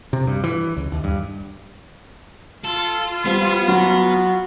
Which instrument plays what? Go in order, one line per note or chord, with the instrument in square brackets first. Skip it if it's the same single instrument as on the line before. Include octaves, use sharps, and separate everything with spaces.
[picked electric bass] C3
G2
E3
C#2
D#2
G2
[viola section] F4 [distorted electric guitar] A4
[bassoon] F3 [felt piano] G3 [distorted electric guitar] B3
[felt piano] F#3 [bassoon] F#4